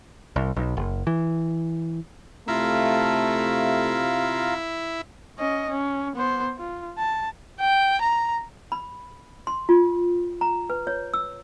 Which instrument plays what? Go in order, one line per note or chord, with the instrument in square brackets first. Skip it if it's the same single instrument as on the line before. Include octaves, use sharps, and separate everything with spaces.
[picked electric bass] C2
B1
F#1
E3
[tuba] C3 [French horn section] A3 [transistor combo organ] E4 [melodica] F4 F5 A#5
[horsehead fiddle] C#4 D#5
C#4
B3 C5
F4
A5
[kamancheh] G5
A#5
[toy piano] B5
C6
F4
A#5
B4
C#5
E6